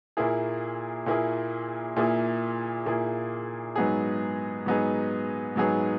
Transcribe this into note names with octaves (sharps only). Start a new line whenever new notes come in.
A#2 A#3 E4 G#4
A#2 A#3 E4 G#4
A#2 A#3 E4 G#4
A#2 A#3 E4 G#4
G#2 F#3 B3 D#4 G#4
G#2 F#3 B3 D#4 G#4
G#2 F#3 B3 D#4 G#4